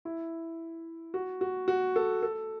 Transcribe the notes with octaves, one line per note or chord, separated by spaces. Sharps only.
E4
F#4
F#4
F#4
A4
A4